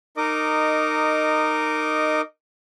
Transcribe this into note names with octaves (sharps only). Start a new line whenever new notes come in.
D#4 A#4 D#5 D6